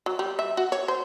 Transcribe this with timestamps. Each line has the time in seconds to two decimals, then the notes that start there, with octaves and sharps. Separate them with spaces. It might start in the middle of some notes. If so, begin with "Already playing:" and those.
0.06 F#3
0.19 G3
0.39 E5
0.57 F#4
0.72 C#5
0.88 C5